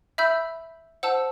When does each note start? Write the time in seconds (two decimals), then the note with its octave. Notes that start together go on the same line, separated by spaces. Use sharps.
0.18 E5 B5 E6 G6
1.03 C5 F#5 A5 E6